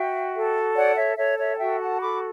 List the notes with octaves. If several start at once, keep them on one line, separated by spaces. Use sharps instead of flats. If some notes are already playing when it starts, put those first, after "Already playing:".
Already playing: F#4 E5 G5
A4
C#5 D5 F#5
C#5 E5
A4 C#5 E5
C#5 E5
A5
F#4 E5 G5
F#5 A5
A4 B5 D6